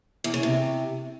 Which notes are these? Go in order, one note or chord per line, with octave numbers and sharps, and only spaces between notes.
E2
C#3
C3